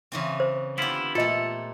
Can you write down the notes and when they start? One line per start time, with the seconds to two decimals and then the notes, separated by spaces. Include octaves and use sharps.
0.12 C#3 E3 C4
0.40 C5
0.78 D3 B3 E4 F4 G4
1.15 A#2 A3 F4 A4 D#5